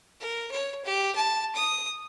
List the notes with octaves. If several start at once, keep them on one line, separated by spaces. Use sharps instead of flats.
A#4
C#5
G4
A5
D#6